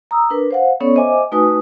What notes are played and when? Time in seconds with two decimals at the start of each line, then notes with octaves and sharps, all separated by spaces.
0.11 A#5 D#6 E6
0.30 D4 A#4 B4
0.51 C5 F5 F#5
0.81 B3 C#4 A4 C#5 D5 C#6
0.95 C5 D#5 E5 G#5 D6
1.32 A3 D#4 F#4 B4 G#5 D#6